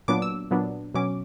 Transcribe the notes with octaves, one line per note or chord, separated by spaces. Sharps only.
A#2 F#3 B3 D4 D6
E6
A#2 F#3 B3 D4
B2 F#3 C#4 D6